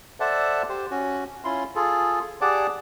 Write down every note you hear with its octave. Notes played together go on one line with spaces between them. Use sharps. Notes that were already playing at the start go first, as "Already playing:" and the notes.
A4 C5 D5 E5 F#5 A5
G4 C5
C#4 F#4
C#4 E4 F4 C6
F4 G#4 A4
G4 G#4 D5 F#5 A5 D6